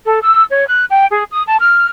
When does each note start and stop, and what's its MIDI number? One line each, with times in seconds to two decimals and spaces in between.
0.05 0.20 69
0.22 0.43 88
0.49 0.67 73
0.67 0.85 90
0.91 1.06 79
1.10 1.24 68
1.32 1.43 87
1.47 1.56 81
1.59 1.88 89